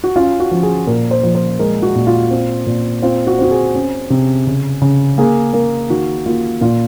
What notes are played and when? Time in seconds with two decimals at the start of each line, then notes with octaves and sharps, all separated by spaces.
0.04 F#4
0.16 C#4 F4
0.40 F#4
0.51 F3
0.63 G#4
0.87 A#2 A#4
1.11 C5
1.23 F3
1.35 C5
1.59 G#3 A#4
1.82 F#4
1.96 A#2
2.07 F4
2.31 C4
2.66 A#2
3.02 C4 F4
3.27 F#4
3.38 C4 F#4
3.51 G#4
3.75 C#4
4.10 C3
4.47 C#3
4.82 C#3
5.18 A#3 G#4
5.53 A#3 A#4
5.90 D#3 F#4
6.26 A#3 F4
6.61 A#2 F4